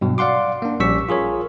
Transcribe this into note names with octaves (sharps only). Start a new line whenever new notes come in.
G2 B2 F#3
D5 F5 F#5 C6 D6
A#3 D4
A#1 G3 C#4 C#6 E6 B6
F4 G#4 A#4 C#5